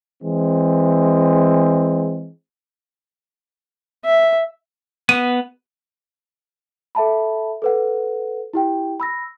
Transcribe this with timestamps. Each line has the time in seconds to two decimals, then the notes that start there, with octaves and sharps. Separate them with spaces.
0.23 E3 G#3 C4
4.05 E5
5.09 B3 D#7
6.95 A4 E5 A5 B5
7.62 A4 B4 F#5
8.53 E4 G4 G5
9.00 B5 E6 A#6